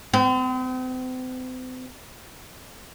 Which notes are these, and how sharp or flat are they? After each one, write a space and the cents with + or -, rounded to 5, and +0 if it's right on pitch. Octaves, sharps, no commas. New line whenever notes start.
C4 -40